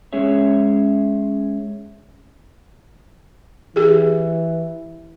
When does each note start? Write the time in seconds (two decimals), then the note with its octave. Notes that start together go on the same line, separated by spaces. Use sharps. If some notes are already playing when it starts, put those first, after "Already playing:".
0.13 G#3 C#4 G#4 C#5 E5
3.76 E3 G4 G#4